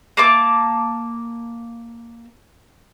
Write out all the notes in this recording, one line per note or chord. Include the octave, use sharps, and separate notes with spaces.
A#3 A5 D6